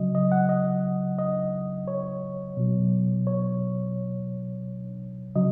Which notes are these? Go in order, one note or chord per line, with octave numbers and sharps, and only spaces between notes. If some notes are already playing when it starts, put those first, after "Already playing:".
Already playing: C#3 F#3 D#5
D#5
F#5
D#5
D#5
C#5
B2 F#3
C#5
C#3 F#3 D#5